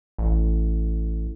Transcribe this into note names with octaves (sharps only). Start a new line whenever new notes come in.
A1